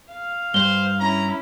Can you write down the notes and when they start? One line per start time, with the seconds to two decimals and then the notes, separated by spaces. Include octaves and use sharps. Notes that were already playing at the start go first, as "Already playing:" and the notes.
0.11 F5
0.54 G2 C5 G7
1.00 C#4 E4 A#5